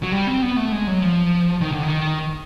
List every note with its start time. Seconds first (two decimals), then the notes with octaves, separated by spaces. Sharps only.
0.03 F#3
0.12 G3
0.27 C4
0.42 B3
0.57 A3
0.72 G#3
0.87 F#3
1.02 F3
1.61 D#3
1.72 D3
1.83 D#3